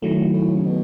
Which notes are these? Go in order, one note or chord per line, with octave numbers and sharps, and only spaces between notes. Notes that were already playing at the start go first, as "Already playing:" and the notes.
A2 D#3 F#3 A3
A2
C#3
B2